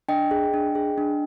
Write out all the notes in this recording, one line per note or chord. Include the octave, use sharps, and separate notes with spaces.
D4 D#5 G5
G#4
D4
G#4
D4